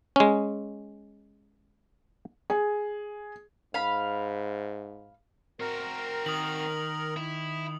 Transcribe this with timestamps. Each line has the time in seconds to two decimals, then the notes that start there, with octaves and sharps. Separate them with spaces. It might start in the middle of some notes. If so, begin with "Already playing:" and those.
0.16 G#3 C#4
2.50 G#4
3.74 G#2 F5 B5
5.60 C4 F#4 A#4
6.26 D#3 D#6 F#7
7.17 E4